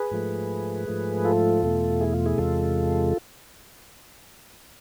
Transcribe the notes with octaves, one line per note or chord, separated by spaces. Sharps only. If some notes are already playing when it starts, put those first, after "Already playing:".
Already playing: G#4 B4
G#2 F3 A3
G#2 F3 A3
F4 A4
E2 B2 A3
E4 G#4
F4
E4 G#4
E2 C3 G#3 F4 A4